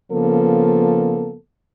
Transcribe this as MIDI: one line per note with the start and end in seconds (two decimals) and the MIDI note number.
0.11 1.35 49
0.11 1.35 53
0.11 1.35 58
0.11 1.35 59
0.11 1.35 69